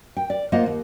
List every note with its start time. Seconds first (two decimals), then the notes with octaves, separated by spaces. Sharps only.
0.17 G5
0.30 D5
0.52 A#3 F4 C5 D#5 F#5
0.66 D#2